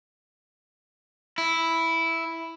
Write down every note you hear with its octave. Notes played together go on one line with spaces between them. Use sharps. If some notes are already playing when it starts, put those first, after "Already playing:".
E4